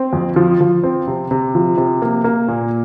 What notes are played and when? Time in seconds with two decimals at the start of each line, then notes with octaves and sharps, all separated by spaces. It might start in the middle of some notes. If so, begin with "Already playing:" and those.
Already playing: C4
0.13 F2
0.36 F3
0.61 F3
0.83 C4
1.07 C3
1.31 C3
1.55 F3
1.77 C3
2.02 A#3
2.24 A#3
2.48 A#2